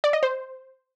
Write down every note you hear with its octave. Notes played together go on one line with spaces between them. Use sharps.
D5
D#5
C5